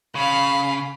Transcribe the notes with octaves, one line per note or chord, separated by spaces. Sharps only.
C#3 F5 B5